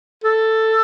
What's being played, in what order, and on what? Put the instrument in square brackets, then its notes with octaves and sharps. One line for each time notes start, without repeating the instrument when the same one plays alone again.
[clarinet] A4